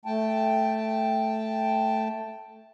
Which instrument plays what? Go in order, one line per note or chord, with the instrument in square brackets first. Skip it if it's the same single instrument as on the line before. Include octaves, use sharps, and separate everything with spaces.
[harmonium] A3 G5 A5